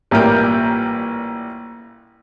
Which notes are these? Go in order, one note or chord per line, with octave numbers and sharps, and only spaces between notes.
A1 A#2 G3 E4 A#4 G5